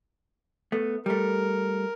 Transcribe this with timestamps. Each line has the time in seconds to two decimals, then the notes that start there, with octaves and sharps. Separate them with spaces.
0.72 A3 B3
1.06 G3 A3 A#4